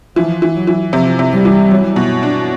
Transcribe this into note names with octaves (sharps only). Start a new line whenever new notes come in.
E3 F3
E3
F#3
E3
C3 F3
C3
G3
E3
F#3
B2
D4